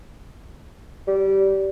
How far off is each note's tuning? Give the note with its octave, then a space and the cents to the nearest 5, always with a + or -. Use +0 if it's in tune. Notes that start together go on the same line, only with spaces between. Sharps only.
G3 -20